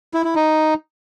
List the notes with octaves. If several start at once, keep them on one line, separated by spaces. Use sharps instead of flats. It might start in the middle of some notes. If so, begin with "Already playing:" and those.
E4
E4
D#4